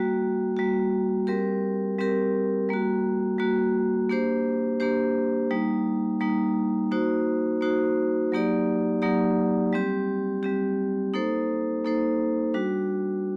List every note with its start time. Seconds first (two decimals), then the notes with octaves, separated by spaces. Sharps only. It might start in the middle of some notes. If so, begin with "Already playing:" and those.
Already playing: G3 A#3 F#4
0.56 G3 A#3 F#4
1.27 G3 C4 G4 A#4
1.98 G3 C4 G4 A#4
2.69 G3 A#3 F#4
3.38 G3 A#3 F#4
4.10 A#3 D4 G4 C5
4.80 A#3 D4 G4 C5
5.51 G3 A#3 D#4
6.20 G3 A#3 D#4
6.91 A#3 D#4 F#4 C5
7.61 A#3 D#4 F#4 C5
8.32 F#3 A#3 D#4 G4 D5
9.02 F#3 A#3 D#4 G4 D5
9.72 G3 C4 G4
10.43 G3 C4 G4
11.14 A#3 D#4 A4 C5
11.85 A#3 D#4 A4 C5
12.54 G3 D4 F#4